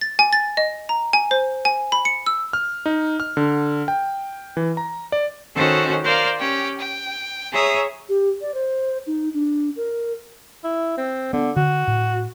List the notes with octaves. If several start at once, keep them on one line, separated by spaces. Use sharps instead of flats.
A6
G#5
A6
D#5
A#5
G#5
C5
G#5
B5
C#7
E6
F6
D#4
F6
D3
G5
E3
A#5
D5
D#3 C#4 F#4 A4 C5
A#4 C5 D5 F5
C#4 G4 G5
G5
G#4 C#5 E5 A#5 D#6
G4
D5
C5
D#4
D4
A#4
E4
C4
D3 B3
D3 F#4
A2